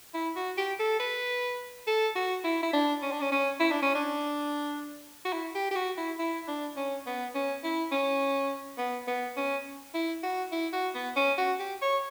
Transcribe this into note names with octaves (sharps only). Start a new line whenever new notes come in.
E4
F#4
G4
A4
B4
A4
F#4
E4
E4
D4
C#4
D4
C#4
C#4
E4
D4
C#4
D4
F#4
E4
G4
G4
F#4
E4
E4
D4
C#4
B3
C#4
E4
C#4
B3
B3
C#4
E4
F#4
E4
F#4
B3
C#4
F#4
G4
C#5